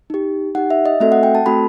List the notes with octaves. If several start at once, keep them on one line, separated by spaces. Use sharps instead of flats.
D#4 G4
D#4 G4 F#5
E5
D#5
A3 C4 F#4 A4 E5
F#5
G5
A5
A3 C4 F#4 A4 B5